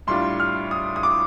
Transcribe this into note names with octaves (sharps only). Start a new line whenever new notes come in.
A2 G3 D4 F4 C6
F6
D#6
D#6
D6